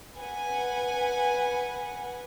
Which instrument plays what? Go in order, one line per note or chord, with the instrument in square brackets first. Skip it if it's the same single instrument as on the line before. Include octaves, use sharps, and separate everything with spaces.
[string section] B4 F#5 G#5